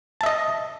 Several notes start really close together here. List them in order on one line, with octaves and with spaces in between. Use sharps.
A5 E5 D#5